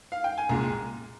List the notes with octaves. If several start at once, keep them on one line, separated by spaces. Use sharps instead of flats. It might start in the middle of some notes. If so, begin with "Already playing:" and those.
F5
G5
G#5
C2 A#2 G#3 A#5